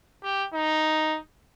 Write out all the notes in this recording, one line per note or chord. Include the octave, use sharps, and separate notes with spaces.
G4
D#4